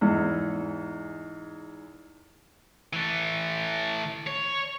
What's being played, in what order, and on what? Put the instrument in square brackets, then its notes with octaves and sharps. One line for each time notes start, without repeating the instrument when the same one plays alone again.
[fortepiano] E2 G#2
[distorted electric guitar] E3 A3
C#5